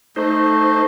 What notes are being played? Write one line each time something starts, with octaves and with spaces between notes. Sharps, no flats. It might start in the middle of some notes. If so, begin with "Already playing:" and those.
A3 D#4 C5